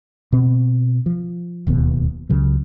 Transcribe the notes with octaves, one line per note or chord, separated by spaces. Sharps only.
B2 C4
F3
D1 D#2 B2 B3
C#2 C#3 F#3